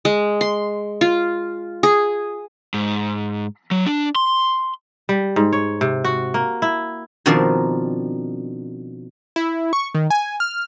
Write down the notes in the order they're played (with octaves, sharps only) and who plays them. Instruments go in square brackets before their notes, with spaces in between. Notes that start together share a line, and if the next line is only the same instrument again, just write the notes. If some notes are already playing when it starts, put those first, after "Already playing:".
[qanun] G#3
C6
F4
G#4
[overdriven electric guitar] G#2
F#3
D4
C6
[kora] G3
G#2
C#5
C3
F#4
A#3
E4
[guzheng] B2 D#3 F3 C4 D4 A#4
[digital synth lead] E4
C#6
D#3
G#5
F6